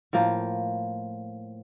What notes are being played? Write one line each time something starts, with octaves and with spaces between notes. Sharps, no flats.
A2 F3 A#3